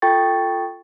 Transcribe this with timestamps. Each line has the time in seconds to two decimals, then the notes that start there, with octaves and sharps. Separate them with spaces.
0.02 F4 A4 G5 C#6 A6